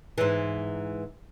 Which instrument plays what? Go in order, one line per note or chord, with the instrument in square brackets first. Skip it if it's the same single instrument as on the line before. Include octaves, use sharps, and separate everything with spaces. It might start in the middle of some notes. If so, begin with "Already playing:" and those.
[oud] G#2 E3